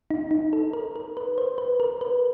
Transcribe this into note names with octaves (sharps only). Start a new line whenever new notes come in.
D#4
D#4
A4
A#4
A#4
B4
C5
B4
A#4
B4